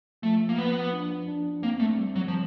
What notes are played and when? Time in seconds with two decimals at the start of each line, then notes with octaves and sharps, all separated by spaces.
0.23 F3 A3
0.49 A#3
0.58 F3 B3
0.93 D4
1.28 D4
1.63 A#3 C4
1.80 A3
1.98 G3
2.15 F#3
2.28 F3